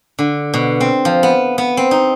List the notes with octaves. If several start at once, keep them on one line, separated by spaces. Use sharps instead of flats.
D3
B2
C4
F3
B3
B3
C4
D#4